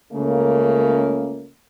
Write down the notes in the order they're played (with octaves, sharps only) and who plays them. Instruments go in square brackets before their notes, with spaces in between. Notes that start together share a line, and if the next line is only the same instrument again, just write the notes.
[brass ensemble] C#2 C#3 A3 A#3